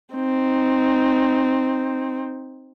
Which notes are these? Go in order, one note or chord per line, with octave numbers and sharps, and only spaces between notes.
C4 D#4